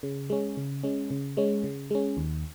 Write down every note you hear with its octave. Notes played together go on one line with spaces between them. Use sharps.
C#3
G#3 C#4
C#3
G#3 C#4
C#3
G#3 C#4
C#3
G#3 C#4
D#2